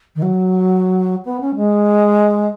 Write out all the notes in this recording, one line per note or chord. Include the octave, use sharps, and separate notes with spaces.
D#3
F#3
B3
C#4
G#3